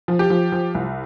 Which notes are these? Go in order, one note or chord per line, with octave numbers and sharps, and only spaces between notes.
F3
G4
F3
F3
C2